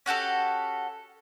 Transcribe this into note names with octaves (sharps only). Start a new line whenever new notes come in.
C#4 F#4 G4 A4